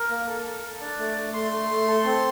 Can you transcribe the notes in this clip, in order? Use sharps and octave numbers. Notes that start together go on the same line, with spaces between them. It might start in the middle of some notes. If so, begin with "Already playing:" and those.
Already playing: A#4
A#3
A4
A4
A4
D4 D5
A3
A3
A3 C6
A3
A3
A4
C4